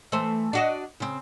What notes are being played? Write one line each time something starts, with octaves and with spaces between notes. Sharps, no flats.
E3 A3 C5
D4 F#4 D#5
C#3 C4